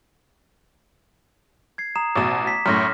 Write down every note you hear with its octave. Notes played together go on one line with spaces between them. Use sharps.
G#6 C7
A#5 D#6 E7
A1 B2 D6 E7
B6
F#2 A2 F6 A#6